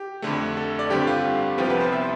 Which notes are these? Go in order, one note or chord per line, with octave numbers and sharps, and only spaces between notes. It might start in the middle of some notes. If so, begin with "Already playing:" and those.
Already playing: G4
F2 D3 A3
A4
D5
G2 D3 G3 C4 G4
F4
C2 C3 F3 B3 G4
B4
C5
E5